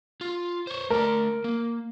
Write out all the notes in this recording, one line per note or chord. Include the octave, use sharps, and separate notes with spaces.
F4
C5 C#5
A3 A#4 D5
A#3